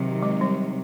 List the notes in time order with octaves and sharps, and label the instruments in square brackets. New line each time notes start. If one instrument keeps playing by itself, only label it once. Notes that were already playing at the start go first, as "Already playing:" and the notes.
Already playing: [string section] C3 D#3 F#3
[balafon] G#3
G3